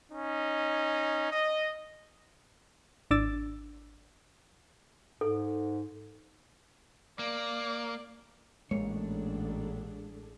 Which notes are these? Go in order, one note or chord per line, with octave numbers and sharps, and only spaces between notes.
C#4 D#4
D#5
G#1 D4 D6 E6 A6
G#2 A4
A#3 D5
A1 A#2 G#3 A#3 D4 G#4 A4 C#5